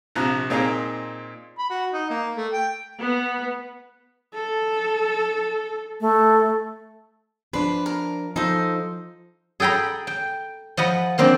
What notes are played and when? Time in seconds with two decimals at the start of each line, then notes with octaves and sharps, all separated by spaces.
0.16 A#1 C3 F3 A#5 F#6
0.50 A#2 C4 D#4 G#4 C5 A#5
1.58 B5
1.70 F#4
1.92 D#4
2.10 A#3
2.37 A3
2.53 G5
2.99 B3
4.34 A4
6.00 A3
7.53 F3 D4 B4 C6
7.86 A#4
8.36 F3 D#4 A4 C5
9.60 G#4 A4 G5 A#5 B5
10.07 G5
10.77 F3 D#5 F#5 B5
11.18 F3 A#3 C4 D4 C5